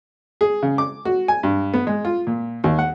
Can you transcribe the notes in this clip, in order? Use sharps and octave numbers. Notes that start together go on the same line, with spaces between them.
G#4
C#3
D6
F#4
G#5
G2
B3
G#3
F4
A#2
D#2
F#5